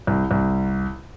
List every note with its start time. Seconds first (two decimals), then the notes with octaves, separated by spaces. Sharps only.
0.07 C2
0.31 C2